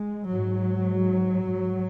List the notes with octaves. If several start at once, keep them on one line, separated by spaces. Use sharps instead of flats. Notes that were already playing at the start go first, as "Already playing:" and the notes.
Already playing: G#3
G#2 F#3
G#2